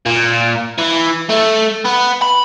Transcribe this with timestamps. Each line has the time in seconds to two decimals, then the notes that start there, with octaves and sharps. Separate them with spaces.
0.06 A#2
0.78 E3
1.30 A3
1.85 B3
2.22 B5